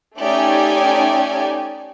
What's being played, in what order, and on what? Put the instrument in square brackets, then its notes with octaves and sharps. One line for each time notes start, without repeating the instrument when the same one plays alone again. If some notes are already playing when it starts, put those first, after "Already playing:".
[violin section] A3 C#4 D#4 G4 D5 G#5